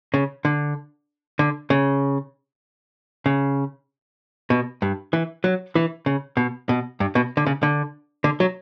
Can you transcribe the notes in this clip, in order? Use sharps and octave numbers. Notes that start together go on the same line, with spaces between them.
C#3
D3
D3
C#3
C#3
B2
G2
E3
F#3
E3
C#3
B2
B2
G2
B2
D3
C#3
D3
D3
F#3